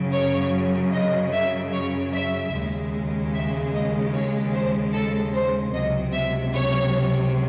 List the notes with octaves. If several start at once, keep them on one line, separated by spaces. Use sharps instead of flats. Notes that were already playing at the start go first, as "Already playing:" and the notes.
Already playing: F#2 C#3 F#3
C#5
D#5
E5
C#5
E5
D#2 C#3 G#3
E5
D#5
C#5
C5
A4
C5
C#2 C3 F#3 D#5
E5
C#5